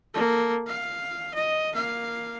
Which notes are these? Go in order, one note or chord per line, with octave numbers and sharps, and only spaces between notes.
A#3 A4
F5
D#5
A#3 F5